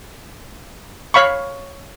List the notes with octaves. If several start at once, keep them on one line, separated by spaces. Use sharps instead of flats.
C#5 F5 B5 C#6